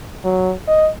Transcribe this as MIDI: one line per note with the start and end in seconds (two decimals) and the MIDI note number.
0.24 0.53 54
0.68 0.89 75